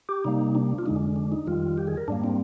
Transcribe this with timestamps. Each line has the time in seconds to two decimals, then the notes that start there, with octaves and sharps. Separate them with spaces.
0.09 G4
0.24 C3 G3 A#3 D#4
0.55 D4
0.78 F4
0.86 F2 D3 G#3 D#4
0.96 D4
1.16 D4
1.32 D#4
1.47 F2 D#3 G3 F4
1.78 G4
1.87 G#4
1.97 A#4
2.08 G#2 G3 A#3 D4
2.24 C4